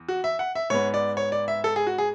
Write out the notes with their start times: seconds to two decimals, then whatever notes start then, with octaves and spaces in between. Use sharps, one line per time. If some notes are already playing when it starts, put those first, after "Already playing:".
Already playing: E2
0.08 F#4
0.24 E5
0.39 F#5
0.55 E5
0.70 G#2 G#3 B3 C#5
0.94 D5
1.17 C#5
1.32 D5
1.48 E5
1.64 A4
1.76 G#4
1.87 F#4
1.98 G#4